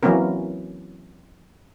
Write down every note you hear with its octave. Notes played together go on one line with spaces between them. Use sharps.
E3 F#3 A#3 C4 C#4 A#4